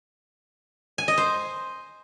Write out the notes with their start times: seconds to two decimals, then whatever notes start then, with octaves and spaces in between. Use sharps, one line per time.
0.98 G#5
1.08 D#5
1.18 C5